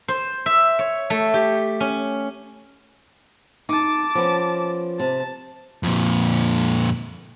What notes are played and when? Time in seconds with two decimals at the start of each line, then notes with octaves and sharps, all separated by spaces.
0.08 C5
0.46 E5
0.79 C#5
1.10 A3
1.34 G4
1.80 C#4
3.69 D#4 A5 D6
4.15 F3 B3 C#4
5.00 C3 A5
5.83 F2 A#2